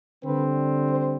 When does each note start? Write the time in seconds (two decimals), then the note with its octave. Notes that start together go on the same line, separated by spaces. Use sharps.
0.24 D3 G3 C4 B4
0.88 C5